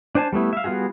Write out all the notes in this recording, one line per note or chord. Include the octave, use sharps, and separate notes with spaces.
D4 C5 G#5 A5
G3 A3 B3 E4
E5 F5
G3 B3 F4 F#4 G#4